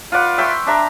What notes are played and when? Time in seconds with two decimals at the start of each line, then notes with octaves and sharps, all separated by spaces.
0.12 F4 B4 D5 F#5
0.38 E5 G5 C6 C#6
0.67 D4 E5 A#5